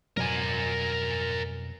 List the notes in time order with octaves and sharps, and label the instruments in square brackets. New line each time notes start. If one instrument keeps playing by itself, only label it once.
[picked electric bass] F2 B2 F#3 [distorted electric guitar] A#4 G#5